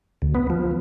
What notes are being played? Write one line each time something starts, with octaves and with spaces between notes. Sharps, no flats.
D2
B3
F3